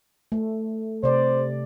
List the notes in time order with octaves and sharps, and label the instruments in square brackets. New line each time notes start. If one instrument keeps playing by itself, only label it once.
[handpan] A3
[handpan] C3 D5 [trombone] C5